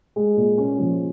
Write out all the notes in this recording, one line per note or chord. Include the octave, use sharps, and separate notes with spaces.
G#3
A#2
C#4
F3